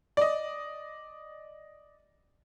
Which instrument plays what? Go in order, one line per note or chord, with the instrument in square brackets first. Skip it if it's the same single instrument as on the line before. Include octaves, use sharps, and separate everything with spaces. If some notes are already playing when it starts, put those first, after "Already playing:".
[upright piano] D5 D#5